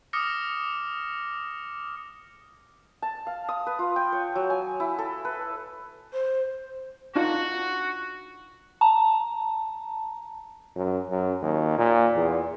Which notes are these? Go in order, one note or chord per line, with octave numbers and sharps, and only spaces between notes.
D6 D#6 F6 A#6 C#7
A5
F5
D#6
B4
F4
G5
C#5
F#3
G#5
E4
A4
B4
C5
D4 D#4 F4 F#4
A5 A#5
F#2
F#2
D#2
A#2
E2